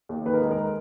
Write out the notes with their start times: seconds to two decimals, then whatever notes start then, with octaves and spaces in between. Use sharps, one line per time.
0.09 D#2
0.26 D#3 B4
0.34 A#4
0.42 G#3 G#4
0.51 A#4